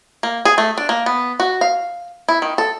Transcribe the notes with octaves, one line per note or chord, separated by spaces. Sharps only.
A#3
G#4
A3
D4
A#3
B3
F#4
F5
E4
D#3
A4